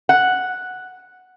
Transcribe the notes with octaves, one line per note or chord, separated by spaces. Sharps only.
F#5